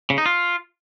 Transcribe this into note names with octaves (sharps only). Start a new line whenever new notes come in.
C#3
D#4
F4